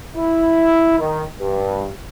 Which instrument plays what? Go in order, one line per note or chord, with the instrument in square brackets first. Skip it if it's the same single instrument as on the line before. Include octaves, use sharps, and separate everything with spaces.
[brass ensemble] E4
D#3
G2